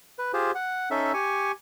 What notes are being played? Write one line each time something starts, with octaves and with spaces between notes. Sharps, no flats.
B4
F4 G4 G#4 C5
F#5
C#4 D#4 A4 E5
G4 G#5 C#6